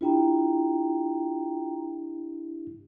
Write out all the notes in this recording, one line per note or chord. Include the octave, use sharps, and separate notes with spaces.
D4 E4 F4 G4 G5 A#5